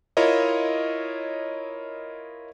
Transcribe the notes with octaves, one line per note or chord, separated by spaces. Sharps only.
E4 F4 A#4 C#5 D#5